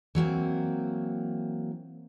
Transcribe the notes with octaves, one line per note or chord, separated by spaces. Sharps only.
E3 F#3 A#3 C4